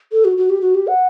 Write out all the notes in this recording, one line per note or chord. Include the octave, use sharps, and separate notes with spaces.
A4
F#4
F#4
G4
F#4
G4
F#5